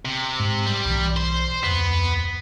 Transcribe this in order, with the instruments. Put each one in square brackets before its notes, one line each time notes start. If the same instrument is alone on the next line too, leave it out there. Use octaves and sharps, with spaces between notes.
[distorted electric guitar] C3
[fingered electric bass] G#2
[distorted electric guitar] G3
[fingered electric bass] B1 E3
[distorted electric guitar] C5
[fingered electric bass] D1 F2 [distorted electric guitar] B3